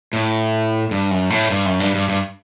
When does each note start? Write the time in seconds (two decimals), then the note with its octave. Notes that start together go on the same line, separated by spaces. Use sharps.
0.13 A2
0.91 G2
1.11 F#2
1.30 A2
1.50 G2
1.66 F#2
1.80 G2
1.95 G2
2.09 G2